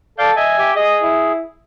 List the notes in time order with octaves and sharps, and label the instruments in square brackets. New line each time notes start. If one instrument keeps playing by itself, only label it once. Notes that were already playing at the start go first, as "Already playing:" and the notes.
[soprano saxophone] A4 [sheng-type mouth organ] D5 F5 G6
[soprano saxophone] D#5 [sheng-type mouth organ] E5 G#5
[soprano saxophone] G4
[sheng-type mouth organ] G#4 [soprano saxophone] D#5
[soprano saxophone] E4